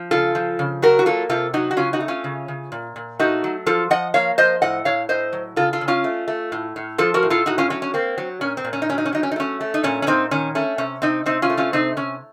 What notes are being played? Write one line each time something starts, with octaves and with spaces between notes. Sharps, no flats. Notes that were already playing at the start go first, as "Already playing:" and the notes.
Already playing: F3
C#3 F4 A4
F3
C#3
F#3 F#4 A#4
F#4
A#3 F4 A4
C3 F4 A4
F#3 D#4 F#4
F#4
C#3 C#4 F4
D#4 F#4
A3
C#4 F4
C#3
C#3
A#2
A#2
A3 D#4 F#4
F#3
F3 F4 A4
F3 D#5 F#5
A#3 C#5 F5
F3 C5 D#5
A2 D#5 F#5
A2 C#5 F5
A2 C5 D#5
F#3
C#3 F4 A4
F4 A4
C#3
C#4 F4
A3
A3
A2
A2
F3 F4 A4
F#4 A#4
A2
F4 A4
A2 D#4 F#4
C#4 F4
F#3 C#4
C#4
A#3 C4
F#3
A#2 C#4
C4
A#2
C#4
D#4
F#3 C#4
D#4
C#4
F#3 D#4
C#4
D#4
A3 C#4
A3
D#4
A#2 C#4
C#4
A#2 C4 D#4
D#3 C#4
A3 C#4
C3 C#4
C3 C4 D#4
C3 C4 D#4
C#4 F4
A3
C#4 F4
C3 C4 D#4
C3 C#4